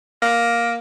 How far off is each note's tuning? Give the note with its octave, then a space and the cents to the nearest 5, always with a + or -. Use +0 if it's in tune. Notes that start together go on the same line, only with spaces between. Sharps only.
A#3 +10